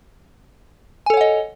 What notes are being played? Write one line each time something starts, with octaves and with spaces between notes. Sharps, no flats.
A4 C#5 D#5 F#5 G#5